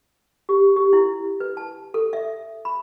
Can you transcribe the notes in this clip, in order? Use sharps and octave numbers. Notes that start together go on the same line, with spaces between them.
G4
G4
E4
B4
A5
A4
E5
B5